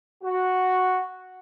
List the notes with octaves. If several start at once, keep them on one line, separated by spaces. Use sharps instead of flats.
F#4